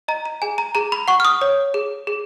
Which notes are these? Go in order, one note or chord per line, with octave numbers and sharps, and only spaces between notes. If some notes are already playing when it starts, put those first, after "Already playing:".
D#5 A#5
A#5
G#4 G#5
A#5
G#4 A#5
B5
F#5 C#6
F6
D#6
C#5
G#4
G#4